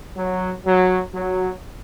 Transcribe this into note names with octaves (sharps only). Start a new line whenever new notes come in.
F#3
F#3
F#3